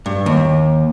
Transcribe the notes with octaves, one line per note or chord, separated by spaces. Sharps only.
G2
D#2